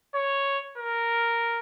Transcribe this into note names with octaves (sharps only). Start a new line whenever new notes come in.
C#5
A#4